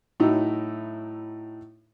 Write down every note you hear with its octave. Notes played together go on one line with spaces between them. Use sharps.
A2 F#3 D#4 E4